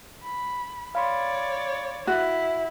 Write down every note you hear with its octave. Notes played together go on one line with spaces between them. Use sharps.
B5
C#5 D5 F5 B5 C6
E4 F#4